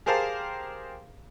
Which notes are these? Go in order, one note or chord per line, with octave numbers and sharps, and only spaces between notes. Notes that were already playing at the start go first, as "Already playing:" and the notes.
G4 G#4 A#4 C5 F5 A5